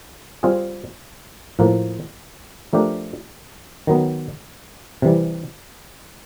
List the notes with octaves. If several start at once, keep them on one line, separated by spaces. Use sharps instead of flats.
G3 C4 F4 G#4
A2 F3 A#3
F3 A3 D4 G4 A#4
D#3 F#3 B3
C3 E3 G3